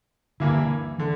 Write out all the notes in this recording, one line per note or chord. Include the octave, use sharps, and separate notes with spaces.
G2 D3 E3 A#3 E4
D3 E3